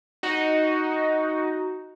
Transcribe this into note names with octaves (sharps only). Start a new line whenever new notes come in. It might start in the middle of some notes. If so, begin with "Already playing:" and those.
D#4 F#4